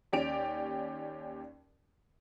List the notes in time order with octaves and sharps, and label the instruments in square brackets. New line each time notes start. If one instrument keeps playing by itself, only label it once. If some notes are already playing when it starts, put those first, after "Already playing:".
[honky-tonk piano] D#2 C#4 G4 D5 D7 F7